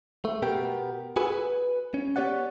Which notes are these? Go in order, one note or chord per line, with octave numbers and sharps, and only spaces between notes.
A3
B2 B3 G4 A#4 G5
F#4 G#4 A4 B4 G#5
B4
C#4
B3 G4 C#5 D5 F#5